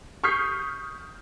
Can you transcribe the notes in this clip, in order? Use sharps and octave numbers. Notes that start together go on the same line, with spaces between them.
C#6 D#6 F6 G6 B6 C7